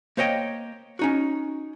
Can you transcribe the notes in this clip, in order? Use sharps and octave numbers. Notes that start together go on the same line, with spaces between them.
A#3 C5 C#5 D#5 G5
C#4 D#4 F#4